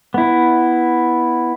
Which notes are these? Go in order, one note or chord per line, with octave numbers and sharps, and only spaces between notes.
B3 E4